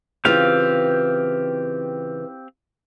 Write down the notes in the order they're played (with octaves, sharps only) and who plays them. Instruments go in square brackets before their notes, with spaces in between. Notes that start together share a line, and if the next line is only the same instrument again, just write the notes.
[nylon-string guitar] C#3 E3 F4 [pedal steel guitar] C4 G4 F5